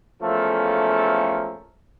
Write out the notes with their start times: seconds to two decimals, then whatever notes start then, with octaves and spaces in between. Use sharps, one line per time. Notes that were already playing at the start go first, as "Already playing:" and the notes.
0.22 E2 F3 A3 A#3 C#4 A4